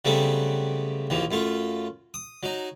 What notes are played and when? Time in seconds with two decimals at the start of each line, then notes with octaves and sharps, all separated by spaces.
0.05 C#3 F#3 G3 A3 B3 C4
1.10 A#1 D#2 E3 F3
1.31 F#2 A3 F4
2.14 D#6
2.43 F#3 D#4